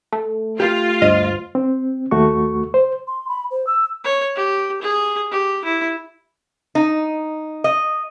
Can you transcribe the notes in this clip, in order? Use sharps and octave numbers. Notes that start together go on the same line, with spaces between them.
A3
F4 G4
D2 G2 C5 D#5
C4
D#2 A3 F#4 C#6
C5
C6
B5
C5
E6
C#5
G4
G#4
G4
E4
D#4
D#5